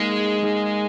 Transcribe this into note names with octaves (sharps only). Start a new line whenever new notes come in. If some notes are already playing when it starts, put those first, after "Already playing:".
Already playing: G#3 A#3 D#4 G#4
A#3 D#4 G#4